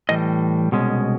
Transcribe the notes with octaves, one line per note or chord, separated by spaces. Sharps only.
A2 E3 G3 D#5
C2 B2 G#3 C#4